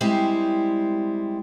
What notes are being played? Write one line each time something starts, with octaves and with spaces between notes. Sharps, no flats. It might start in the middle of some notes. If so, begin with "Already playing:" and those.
G3 G#3 C4 E4 G4